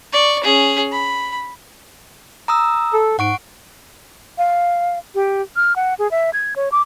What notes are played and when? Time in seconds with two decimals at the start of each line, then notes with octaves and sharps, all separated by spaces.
0.12 D5 C#6
0.44 C#4 G#4
0.92 B5
2.48 A#5 D#6 E6
2.93 A4
3.19 G#2 F#5 C#6 D7
4.38 F5
5.15 G4
5.56 F6
5.76 F#5
5.99 G#4
6.11 E5
6.33 G#6
6.56 C#5
6.72 D6